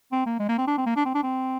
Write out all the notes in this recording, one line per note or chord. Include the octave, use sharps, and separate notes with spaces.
C4
A#3
G#3
A#3
C4
D4
C4
A#3
D4
C4
D4
C4